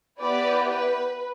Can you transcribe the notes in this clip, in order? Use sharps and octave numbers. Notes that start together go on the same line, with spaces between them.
B3 E4 G4 B4 D5
B4